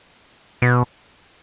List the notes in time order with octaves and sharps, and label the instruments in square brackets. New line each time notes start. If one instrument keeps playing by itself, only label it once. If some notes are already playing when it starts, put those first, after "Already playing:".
[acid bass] B2